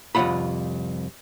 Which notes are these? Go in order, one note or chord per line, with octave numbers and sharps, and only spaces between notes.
C2 F2 C#3 F4 F#5 B5